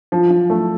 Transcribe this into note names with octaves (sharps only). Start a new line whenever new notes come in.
F3
F3
A3